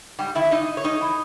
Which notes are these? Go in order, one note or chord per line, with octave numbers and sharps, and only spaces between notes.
G#2 G3 G4
D#3 E4 E5
A#2 D#4 D#5
C#5
G#2 D#4 D#5
E3